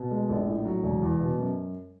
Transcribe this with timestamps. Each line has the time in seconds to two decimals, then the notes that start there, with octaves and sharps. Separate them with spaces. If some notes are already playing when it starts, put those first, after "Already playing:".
Already playing: B2
0.11 G#3
0.29 A#1
0.47 A2
0.65 F#3
0.83 E1
1.02 E2
1.20 B2
1.39 F#2